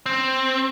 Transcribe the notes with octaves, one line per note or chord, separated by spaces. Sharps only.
C4